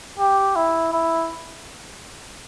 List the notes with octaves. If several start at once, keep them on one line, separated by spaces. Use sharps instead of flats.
G4
E4
E4